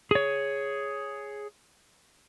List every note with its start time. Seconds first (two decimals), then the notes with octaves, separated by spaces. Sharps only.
0.11 G#4 C#5